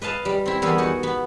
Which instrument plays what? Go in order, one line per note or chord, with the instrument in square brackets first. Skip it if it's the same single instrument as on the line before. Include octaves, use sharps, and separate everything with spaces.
[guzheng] B4 D#5 F5 A5
G3
C4 E4
E2 G3 B3 G#4 A#4 B5
D#4 F#4
B3